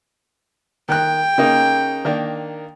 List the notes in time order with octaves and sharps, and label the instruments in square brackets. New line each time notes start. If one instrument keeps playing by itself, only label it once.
[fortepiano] D#3 F#6 [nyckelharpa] G5
[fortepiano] C#3 A#3 D#4
D#3 A#3 D4